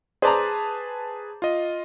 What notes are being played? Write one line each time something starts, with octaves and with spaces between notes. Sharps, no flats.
G#4 B4 C5 D5 A5 A#5
F4 D#5